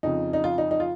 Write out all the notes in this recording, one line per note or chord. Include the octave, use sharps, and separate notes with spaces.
F2 C#3 F3 D#4
D#4
F4
D#4
D#4
F4